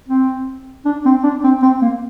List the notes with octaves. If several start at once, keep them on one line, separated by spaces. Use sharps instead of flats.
C4
D4
C4
D4
C4
C4
A#3